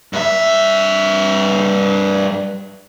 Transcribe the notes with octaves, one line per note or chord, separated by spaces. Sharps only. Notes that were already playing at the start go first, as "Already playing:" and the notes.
G2 E5